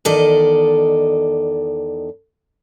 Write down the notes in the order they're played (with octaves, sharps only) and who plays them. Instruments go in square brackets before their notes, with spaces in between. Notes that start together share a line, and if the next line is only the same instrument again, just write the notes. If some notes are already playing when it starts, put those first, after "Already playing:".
[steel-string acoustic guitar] E2 D#3 A4 D5 D#5